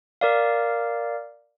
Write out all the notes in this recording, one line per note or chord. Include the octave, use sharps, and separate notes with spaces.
A#4 D5 F5